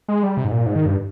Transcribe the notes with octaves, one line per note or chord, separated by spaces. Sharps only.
G#3
G3
C3
G#2
A#2
G#2
D#3
G2